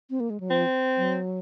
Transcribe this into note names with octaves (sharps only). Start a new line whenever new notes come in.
C4
A#3
G#3
F#3
F3 C4
F#3